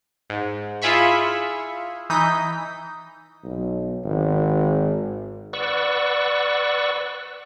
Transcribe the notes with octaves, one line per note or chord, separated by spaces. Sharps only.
G#2
E4 F4 G#4 E5 B5 C#6
E3 D#4 D#6 G6 B6
B1
G#1
B4 D5 F#5 C#6 E6